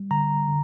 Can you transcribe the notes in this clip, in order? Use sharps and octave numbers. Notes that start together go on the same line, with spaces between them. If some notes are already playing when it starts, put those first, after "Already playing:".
Already playing: G3
D3 A#5
D3